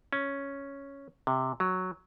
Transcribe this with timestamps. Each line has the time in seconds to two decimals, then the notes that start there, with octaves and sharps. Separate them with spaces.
0.13 C#4
1.27 C3
1.60 F#3